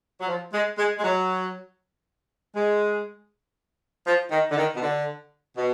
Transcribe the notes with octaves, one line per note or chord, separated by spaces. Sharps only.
F#3
F3
G#3
G#3
G#3
F#3
G#3
F3
D#3
D3
D#3
B2
D3
B2